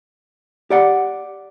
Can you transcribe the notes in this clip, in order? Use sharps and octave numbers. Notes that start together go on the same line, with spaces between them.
G4 D5 F#5